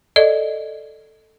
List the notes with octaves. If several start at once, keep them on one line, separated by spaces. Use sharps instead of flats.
A4 D5 D#5